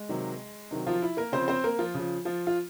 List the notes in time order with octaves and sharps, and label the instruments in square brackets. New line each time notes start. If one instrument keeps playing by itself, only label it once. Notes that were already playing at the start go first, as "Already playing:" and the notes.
Already playing: [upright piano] G#3
C3 D#3 F#3
C3 D#3 F#3
F3 F4
E4
A#3 A#4
C#3 F3 C4 C5
C4 C5
A#3 A#4
F3 F4
C#3 F3
F3 F4
F4